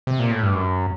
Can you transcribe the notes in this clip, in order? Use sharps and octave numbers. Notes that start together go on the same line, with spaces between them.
C3
A#2
A2
G2
F#2